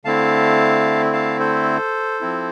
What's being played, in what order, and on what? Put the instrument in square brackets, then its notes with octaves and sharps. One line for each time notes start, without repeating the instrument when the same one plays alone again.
[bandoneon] D3 A3 C4 E4 F5 A5
F5 A5
A4 C5
F3 C4 E4